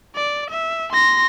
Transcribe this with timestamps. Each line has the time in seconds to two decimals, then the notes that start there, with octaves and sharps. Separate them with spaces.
0.15 D5
0.51 E5
0.93 C6 A#6